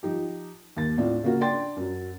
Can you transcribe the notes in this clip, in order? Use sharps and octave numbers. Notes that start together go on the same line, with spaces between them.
F3 D#4 G4
D#2 A6
A2 C4 D4 F4
C#3 A#3 F#4
D4 G5 C6 A6
F#2 F#3